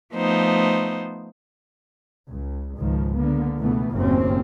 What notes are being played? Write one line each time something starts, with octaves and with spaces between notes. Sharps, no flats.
F3 A3 B3 D#4 C5
C#2
C#2 G#2 D#3 F3
D3 A#3 B3
C#2 B2 E3 A3 B3
F#1 D#2 A2 A#3 C4 C#4